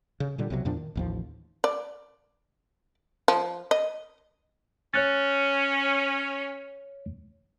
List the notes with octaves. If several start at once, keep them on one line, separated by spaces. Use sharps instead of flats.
C#3
A#2 D3 G3
B1 C3 D#3 F#3
E2 A#2 F3 D4
D#3
A1 D#2 F3
D5
F3
D#5
C#4 C#5 F#6 A6